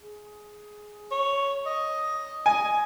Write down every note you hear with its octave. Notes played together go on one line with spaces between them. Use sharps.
G#4
C#5
D#5
D#5 G#5